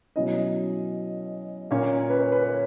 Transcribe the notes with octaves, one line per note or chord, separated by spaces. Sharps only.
B2 F#3 C#4 E4 D#5
A#2 A#3 C#4 C#5
B4
C#5
B4
C#5